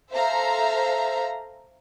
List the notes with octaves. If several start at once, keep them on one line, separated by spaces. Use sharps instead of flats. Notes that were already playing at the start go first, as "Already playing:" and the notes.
A4 C5 E5 F5 A#5